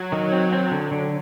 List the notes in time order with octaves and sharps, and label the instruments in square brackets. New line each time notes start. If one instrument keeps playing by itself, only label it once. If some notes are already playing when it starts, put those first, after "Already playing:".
Already playing: [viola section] F#3
[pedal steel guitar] D#3
C4
C4
D3
D3